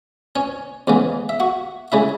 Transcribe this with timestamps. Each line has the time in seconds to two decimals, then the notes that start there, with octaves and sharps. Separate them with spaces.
0.36 C#4 C#5
0.87 E2 C#3 G#3 B3
1.29 E5
1.40 F#4 F#5
1.92 C#3 G#3 E4 E5